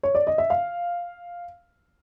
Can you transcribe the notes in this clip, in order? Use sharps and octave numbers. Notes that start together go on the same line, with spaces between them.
C#5
D5
D#5
E5
F5